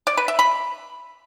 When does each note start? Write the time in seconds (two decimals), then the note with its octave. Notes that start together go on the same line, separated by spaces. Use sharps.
0.07 D5
0.17 B4
0.28 E5
0.39 B5